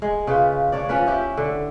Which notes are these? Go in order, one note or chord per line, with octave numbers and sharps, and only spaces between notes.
G#3
C#3 F4 B4
D4 C#5 D5
F3 C#4 B4
E4 G4 B4
D3